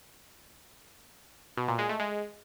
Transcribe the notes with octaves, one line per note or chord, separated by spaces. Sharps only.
B2
A#2
G#3
A3
G#3